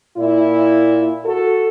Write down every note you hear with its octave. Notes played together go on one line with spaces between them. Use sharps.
A#2 E4
F#4 A4